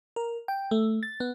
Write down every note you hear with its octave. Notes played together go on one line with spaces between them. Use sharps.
A#4
G5
A3
A6
B3